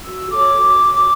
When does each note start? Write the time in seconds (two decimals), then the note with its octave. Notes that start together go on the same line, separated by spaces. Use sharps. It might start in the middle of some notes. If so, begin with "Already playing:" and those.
0.05 F#4 E6
0.30 A4 C#5 D6
0.56 F#4